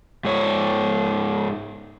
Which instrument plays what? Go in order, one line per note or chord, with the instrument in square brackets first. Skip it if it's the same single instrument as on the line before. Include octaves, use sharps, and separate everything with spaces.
[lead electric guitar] G#2 C#5